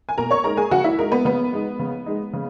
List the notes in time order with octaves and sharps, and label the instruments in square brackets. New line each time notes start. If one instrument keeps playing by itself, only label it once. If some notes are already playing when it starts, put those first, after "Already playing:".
[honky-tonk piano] G#5
B2 A#4 A#5
C#5 C#6
G#3 D#4 A#4 A#5
G#4 G#5
C#3 F#4 F#5
E4 E5
G#3 D#4 A#4
B3 B4
C#3 B3 B4
G#3 D#4
C#3
G#3 D#4
C#3